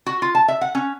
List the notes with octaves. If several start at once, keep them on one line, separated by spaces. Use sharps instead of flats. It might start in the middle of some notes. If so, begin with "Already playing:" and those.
F#4
F4
A5
E5
F#5
C#4